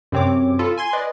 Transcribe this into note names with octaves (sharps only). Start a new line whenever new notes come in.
F#2 C3 C4 C#5 D6
F4 A4 B5
G#5 C6 G#6
B4 D5 D#5